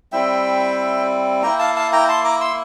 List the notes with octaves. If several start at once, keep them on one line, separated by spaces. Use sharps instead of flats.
G3 C4 E4 E5 G5
A#3 E4 G5 A#5
F5 A5
F5 A5
G5 A#5
A5 C6
A#5 D6
C6 E6